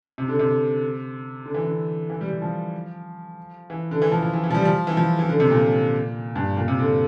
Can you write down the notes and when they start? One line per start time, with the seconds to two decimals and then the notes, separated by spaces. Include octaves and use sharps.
0.18 C3
0.28 D3
0.39 C3
1.46 D3
1.54 E3
1.64 D3
2.10 E3
2.21 G3
2.31 G3
2.42 F3
3.70 E3
3.91 D3
4.02 E3
4.12 F3
4.23 F3
4.33 E3
4.44 E3
4.51 F3
4.55 G3
4.65 F3
4.87 E3
4.97 F3
5.19 E3
5.29 D3
5.40 C3
5.50 A#2
6.36 G2
6.57 A#2
6.68 C3
6.79 D3